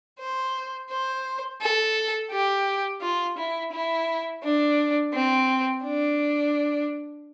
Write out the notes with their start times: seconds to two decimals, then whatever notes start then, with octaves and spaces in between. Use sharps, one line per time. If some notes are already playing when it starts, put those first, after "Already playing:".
0.20 C5
0.91 C5
1.62 A4
2.31 G4
3.02 F4
3.38 E4
3.72 E4
4.44 D4
5.14 C4
5.84 D4